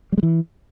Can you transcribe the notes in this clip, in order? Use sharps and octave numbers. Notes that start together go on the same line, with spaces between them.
G3
G#3
E3